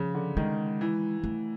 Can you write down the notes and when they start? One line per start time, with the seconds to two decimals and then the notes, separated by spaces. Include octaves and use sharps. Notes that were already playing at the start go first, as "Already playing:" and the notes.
Already playing: C#3 F3
0.15 D3
0.37 D#3 G#3
0.81 E3
1.24 A3